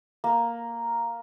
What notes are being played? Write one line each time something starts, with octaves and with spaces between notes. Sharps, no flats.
A#3